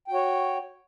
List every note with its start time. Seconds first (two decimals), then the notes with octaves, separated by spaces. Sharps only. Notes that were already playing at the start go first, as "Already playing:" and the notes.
0.08 G5
0.11 F#4
0.14 C#5